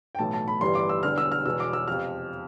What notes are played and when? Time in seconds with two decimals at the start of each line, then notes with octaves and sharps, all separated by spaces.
0.15 G5
0.19 B1 A2 E3 A3 A5
0.33 A5
0.48 B5
0.61 G1 G2 E3 G3 C6
0.75 D6
0.89 E6
1.03 E1 E2 D3 G3 F6
1.18 E6
1.32 F6
1.45 E1 E2 B2 E6
1.60 D6
1.73 E6
1.87 F2 C3 F3 F6